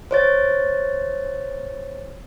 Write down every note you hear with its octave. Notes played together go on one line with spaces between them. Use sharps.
C5 C#5 A6